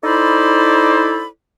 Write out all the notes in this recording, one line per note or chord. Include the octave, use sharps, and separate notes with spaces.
D#4 E4 A4 C5 D5 B5